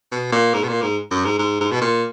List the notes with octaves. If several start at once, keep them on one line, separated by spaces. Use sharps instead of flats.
B2
A#2
G#2
B2
A#2
G#2
F#2
G#2
G#2
G#2
B2
A#2